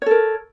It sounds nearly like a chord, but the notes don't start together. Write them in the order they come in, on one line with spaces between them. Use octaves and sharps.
C#5 A4 A#4